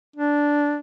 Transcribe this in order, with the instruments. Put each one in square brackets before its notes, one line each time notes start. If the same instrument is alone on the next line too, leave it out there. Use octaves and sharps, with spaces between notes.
[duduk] D4